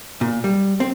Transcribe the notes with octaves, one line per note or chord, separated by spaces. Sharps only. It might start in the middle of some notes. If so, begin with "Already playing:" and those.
A#2
G3
C4